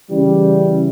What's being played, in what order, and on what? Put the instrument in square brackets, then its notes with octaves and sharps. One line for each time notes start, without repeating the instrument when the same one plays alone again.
[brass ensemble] C#3 E3 G3